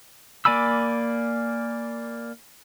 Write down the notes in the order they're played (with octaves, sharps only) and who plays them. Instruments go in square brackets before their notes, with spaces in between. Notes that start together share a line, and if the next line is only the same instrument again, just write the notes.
[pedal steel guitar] A#3 D5 G#5 B5 E6